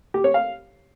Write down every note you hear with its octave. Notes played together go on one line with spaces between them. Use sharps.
G4
C#5
F5